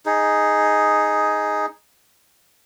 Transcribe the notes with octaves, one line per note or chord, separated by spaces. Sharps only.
D#4 G#4